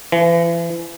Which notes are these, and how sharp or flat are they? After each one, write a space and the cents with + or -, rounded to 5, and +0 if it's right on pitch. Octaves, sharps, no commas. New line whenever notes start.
E3 +40